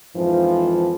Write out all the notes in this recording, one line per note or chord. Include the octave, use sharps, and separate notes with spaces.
F2 G#2 E3 F3